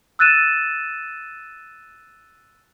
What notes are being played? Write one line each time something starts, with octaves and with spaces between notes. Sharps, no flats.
E6 F#6 A6 D#7 E7